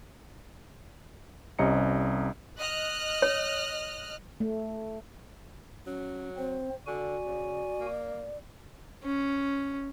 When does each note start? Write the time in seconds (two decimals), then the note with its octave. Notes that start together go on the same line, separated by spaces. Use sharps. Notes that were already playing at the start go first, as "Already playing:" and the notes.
1.59 C2 C3 C#4 D#5 A#5 C#7
2.60 D#5 F6 F#6
3.22 C#5
4.40 A3
5.86 F#3 C#4
6.37 C4 C5
6.87 D3 F#4 D5 G#5
7.26 C#3
7.80 A#3
9.04 C#4